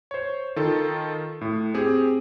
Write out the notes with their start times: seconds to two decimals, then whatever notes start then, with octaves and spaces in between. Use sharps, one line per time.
0.11 C5 C#5
0.56 D#3 F4 A4
1.41 A2
1.74 C4 G4 G#4